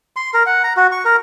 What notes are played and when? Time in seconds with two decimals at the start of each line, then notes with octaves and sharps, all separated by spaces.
0.16 C6
0.34 A#4
0.46 F#5
0.64 A#5
0.77 F#4
0.92 C#6
1.05 A#4